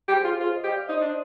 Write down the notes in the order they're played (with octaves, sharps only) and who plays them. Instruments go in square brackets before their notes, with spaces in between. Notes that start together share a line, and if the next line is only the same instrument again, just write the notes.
[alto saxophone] G4
[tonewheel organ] G#4 C5
[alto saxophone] F4
[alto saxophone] F4 [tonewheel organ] G#4 C5
[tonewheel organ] C5 D#5
[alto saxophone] G4
[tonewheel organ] D5 F5
[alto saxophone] D#4 [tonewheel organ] C5 D#5
[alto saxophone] D4